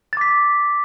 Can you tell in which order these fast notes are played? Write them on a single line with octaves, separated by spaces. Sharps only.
A6 D6 B6